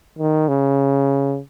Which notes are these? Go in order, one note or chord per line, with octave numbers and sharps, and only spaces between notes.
D#3
C#3